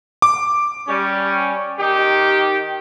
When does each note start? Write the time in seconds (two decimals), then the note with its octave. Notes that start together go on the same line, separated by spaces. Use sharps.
0.22 D6
0.88 G3 C#4
1.80 D#3 D#4 G4